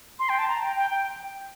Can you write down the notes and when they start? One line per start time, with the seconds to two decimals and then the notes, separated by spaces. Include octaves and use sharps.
0.19 C6
0.29 G5
0.38 A5
0.48 A#5
0.62 G5
0.76 G5
0.91 G5